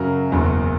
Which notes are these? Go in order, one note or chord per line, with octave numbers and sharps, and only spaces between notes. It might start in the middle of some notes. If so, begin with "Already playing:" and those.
Already playing: F#2 C#3 F#3 A#4
F#1 E2 B2 F#3